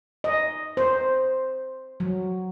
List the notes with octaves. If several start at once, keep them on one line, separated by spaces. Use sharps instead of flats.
D#5
C5
F#3